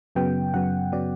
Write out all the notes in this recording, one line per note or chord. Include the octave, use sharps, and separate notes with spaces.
F#2 C#3 F#3 B3 G5
F#2 C#3 F#3 B3 F#5
C#3 F#3 B3 D5